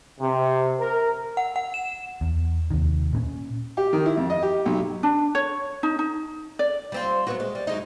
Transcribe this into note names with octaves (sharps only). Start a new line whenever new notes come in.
C3
A#4
F#5
F#5
E7
E2
D#2 C3 D#3
A#2 B3 C#4
G4
D#3
E4
F2
D#5
G4
B1
D4
C#5
D#4
D#4
D5
G3 C4 F4
F#3 B3 F#4
G#3
G3
F#3 G#3 D#4